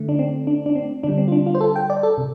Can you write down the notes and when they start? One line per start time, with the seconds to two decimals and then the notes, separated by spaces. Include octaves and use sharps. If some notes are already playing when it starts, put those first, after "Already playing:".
Already playing: D3 A3
0.09 D4
0.19 C4
0.47 D4
0.66 D4
0.75 C4
1.03 D3 G3 D4
1.18 C4
1.28 F4
1.32 D4
1.46 F4
1.55 C5
1.61 A4
1.76 G5
1.90 D5
2.03 A4
2.18 C3